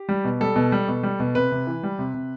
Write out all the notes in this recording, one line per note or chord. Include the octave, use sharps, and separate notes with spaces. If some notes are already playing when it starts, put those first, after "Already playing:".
Already playing: G4
G3
B2
G3 A4
B2
G3
B2
G3
B2
C3 B4
C3
E3
G3
C3
C3